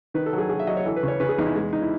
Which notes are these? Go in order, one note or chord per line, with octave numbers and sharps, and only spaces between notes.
D#3 B4
A4
F#3
G#4
F#3 G#4
E5
F#3 D#5
C#5
E3 A4
B4
C#3
C#5
C#3 B4
G#4
E2 D#4
E4
G#3
D#4
E4